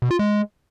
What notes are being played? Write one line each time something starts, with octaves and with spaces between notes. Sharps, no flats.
B2
F4
G#3